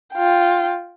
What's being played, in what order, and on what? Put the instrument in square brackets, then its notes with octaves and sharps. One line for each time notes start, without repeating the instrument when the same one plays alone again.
[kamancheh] F4 G5